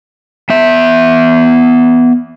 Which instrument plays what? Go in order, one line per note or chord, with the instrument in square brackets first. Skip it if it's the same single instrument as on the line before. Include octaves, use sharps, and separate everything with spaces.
[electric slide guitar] B3 E5